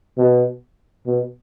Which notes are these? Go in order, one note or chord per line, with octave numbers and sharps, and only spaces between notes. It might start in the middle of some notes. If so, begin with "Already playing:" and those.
B2
B2